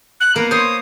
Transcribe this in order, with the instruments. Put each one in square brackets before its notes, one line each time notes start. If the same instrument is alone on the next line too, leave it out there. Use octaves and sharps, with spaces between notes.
[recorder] F#6
[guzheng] A#3 B3 A#4 [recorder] A#5
[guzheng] C5 C#5 [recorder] D#6